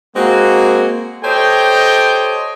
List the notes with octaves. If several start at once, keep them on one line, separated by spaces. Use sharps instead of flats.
G#3 A#3 C4 F#4
G4 A4 C5 C#5 D#5 G5